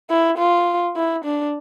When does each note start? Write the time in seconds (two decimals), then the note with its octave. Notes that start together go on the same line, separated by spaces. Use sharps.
0.10 E4
0.38 F4
0.96 E4
1.25 D4